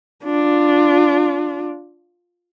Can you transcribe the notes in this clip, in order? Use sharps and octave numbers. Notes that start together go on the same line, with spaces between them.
D4 F4